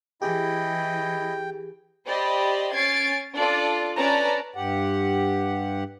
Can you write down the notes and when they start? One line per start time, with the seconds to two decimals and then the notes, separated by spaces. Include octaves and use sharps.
0.22 E3 E4 G4 G#4 D#5 G5
2.07 G4 C5 D5 D#5 B5
2.73 C#4 G#6 A6 C7 D7
3.36 D4 F4 A4 D5
3.97 C#4 B4 D5 A5 A#5
4.56 G2 G4 F#5